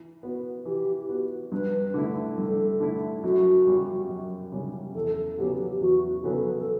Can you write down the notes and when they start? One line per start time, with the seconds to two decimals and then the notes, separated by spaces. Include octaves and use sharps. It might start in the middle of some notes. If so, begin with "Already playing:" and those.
Already playing: E3
0.23 B3 F#4
0.65 E3 G4
1.09 B3 F#4
1.52 G2 B4
1.94 D3 A3 E4
2.37 G2 A4
2.80 D3 A3 E4
3.23 F#2 F#4
3.67 C#3 G3
4.09 F#2
4.52 C#3 G3
4.95 E2 A4
5.38 C#3 F#3 B3 F#4 G4
5.81 E2 F#4
6.24 C#3 F#3 B3 F#4 A4
6.59 A4